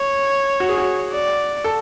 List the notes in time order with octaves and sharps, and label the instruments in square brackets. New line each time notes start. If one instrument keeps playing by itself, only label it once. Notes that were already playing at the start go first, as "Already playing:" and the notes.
Already playing: [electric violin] C#5
[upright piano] F#4
G#4
F#4
[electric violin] D5
[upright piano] A4